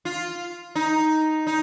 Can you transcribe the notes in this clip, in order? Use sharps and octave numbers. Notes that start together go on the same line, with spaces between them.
F4
D#4
D#4